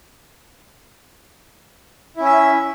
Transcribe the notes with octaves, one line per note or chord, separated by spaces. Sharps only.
C#4 E4 E5